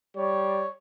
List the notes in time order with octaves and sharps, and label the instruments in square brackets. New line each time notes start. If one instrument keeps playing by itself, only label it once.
[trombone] G3 [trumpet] C#5